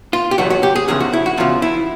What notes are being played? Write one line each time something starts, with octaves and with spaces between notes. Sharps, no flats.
F4
G4
E2 B2 F#3 F#4
F#4
G4
G#4
E2 C#3 F3 G#4
F#4
E4
F#4
E2 C#3 F3 F4
E4